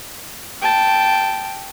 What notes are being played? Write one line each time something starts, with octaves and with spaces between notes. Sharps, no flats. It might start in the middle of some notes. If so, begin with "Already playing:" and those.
G5 A5